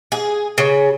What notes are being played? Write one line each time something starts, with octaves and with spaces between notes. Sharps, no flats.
G#4
C#3